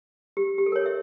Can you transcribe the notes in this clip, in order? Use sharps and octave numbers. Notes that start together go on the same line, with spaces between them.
G4
G4
A4
A#4
C#5
E5